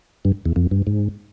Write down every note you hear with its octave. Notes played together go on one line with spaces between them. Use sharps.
G2
E2
F2
G2
G#2